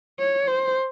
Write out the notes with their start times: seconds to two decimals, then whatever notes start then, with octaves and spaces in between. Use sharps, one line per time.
0.19 C#5
0.47 C5